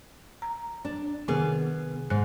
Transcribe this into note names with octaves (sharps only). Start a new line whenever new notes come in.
A#5
D4
C3 D#3 B3 G#4
G#2 F#6